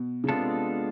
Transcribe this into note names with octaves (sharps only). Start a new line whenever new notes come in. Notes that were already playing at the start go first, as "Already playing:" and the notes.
Already playing: B2
C#3
C3 G#3 B3 D4 F4 A4